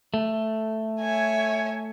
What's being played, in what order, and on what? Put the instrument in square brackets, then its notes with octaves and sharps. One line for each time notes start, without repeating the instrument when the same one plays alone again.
[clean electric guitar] A3
[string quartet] C#5 E5 G#5